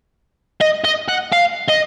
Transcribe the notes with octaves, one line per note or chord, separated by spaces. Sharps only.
D#5
D#5
F#5
F5
D#5